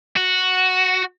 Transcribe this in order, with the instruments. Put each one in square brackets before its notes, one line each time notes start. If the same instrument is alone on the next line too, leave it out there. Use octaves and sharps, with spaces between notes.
[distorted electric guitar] F#4